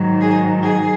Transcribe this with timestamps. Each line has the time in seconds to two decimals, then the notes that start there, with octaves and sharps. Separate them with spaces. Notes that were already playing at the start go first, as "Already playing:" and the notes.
Already playing: G#2 D#3 F#3
0.20 G#4
0.62 G#4